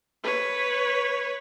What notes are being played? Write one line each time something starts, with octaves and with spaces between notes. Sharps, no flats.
B4 C#5